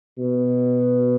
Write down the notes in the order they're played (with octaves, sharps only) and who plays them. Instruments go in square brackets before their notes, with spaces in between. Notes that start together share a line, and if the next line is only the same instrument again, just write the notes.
[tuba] B2